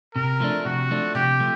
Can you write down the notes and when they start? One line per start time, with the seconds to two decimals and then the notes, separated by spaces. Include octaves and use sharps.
0.15 C3 A#4
0.40 F3 A3 D4
0.65 C3 F#4
0.90 F3 A3 D4
1.15 C3 G4
1.40 F3 A3